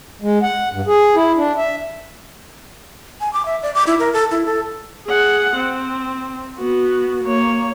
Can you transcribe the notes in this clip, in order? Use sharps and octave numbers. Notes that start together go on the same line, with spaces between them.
G#3
F#5
G2
G#4
E4
D4
E5
G#5
D6
E5
D5
D6
E4
A#4
A4
E4
A4
G#4 F#5
C4
B3 F#4
A#3 C#5